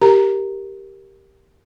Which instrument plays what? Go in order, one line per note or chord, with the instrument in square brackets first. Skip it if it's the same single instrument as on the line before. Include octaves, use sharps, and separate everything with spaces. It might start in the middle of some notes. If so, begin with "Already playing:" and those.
[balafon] G4 A#4 A#5